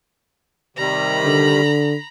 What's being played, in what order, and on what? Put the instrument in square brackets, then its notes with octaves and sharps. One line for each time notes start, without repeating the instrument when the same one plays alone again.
[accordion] C3 D#3 G3 [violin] A#5 B5
[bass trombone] D3